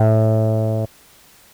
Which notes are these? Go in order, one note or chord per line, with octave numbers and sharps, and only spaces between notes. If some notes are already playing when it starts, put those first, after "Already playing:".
Already playing: A2